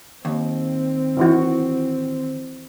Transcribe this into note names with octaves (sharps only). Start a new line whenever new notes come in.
D#2 C4
D#3 E3 F#4